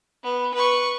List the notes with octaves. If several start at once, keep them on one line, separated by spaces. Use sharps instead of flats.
B3
B4 C#6